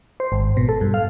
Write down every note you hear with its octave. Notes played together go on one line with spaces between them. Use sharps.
C5
G#1
B2
A4
G2
F5